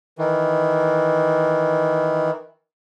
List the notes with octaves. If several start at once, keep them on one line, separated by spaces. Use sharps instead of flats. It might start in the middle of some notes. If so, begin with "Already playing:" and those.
D#3 E3